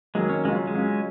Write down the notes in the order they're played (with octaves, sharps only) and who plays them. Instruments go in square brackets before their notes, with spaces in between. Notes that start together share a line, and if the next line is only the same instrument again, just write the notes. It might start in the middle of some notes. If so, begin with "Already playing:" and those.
[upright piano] D#3 F#3 A#3 [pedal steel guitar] G#3
[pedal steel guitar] C#4
[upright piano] C#3 F#3 C#4 F4 [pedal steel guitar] G#3
[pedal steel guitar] G#3
[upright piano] F#3 C#4 F4